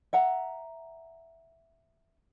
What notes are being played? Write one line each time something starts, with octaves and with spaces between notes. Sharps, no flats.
E5 F#5 A#5